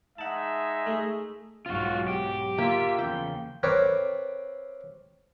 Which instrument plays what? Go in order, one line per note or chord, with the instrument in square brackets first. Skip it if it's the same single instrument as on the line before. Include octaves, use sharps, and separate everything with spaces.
[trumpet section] G#3 D#4 E5 [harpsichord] F#5 A5
[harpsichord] A3 G#4
[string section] B1 G#2 F#3 [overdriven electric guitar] F4 F#4
[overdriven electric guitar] G4
[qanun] A#3 [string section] F4 E5 B6
[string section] E2 C#3 F3 [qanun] G5
[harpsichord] C4 A#4 B4 C#5 D5